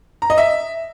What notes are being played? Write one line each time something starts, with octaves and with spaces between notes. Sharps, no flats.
A#5
D#5
E5